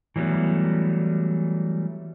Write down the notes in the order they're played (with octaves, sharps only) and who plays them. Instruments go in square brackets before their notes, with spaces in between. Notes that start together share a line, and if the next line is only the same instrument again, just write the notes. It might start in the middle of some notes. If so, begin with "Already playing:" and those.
[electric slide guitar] E3 F#3 G3 A3 B3